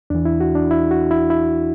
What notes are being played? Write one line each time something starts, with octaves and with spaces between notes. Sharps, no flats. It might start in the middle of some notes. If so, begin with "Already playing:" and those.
E2 E3 D4
E4
F#4
D4
E4
F#4
E4
E4